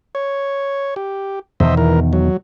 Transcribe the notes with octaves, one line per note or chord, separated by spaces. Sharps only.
C#5
G4
E2 B2 D#3 C5 D#5 E5
E3 A#4
F#3